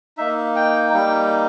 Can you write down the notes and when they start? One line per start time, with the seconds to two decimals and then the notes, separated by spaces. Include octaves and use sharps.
0.17 A#3 D#4 E5
0.56 G5
0.94 G3 A#3 D#4